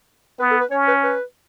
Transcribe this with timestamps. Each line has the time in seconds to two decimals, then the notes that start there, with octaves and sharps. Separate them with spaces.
0.40 B3 B4
0.51 A4
0.61 B4
0.71 C#4 C#5
0.88 B4
1.03 B4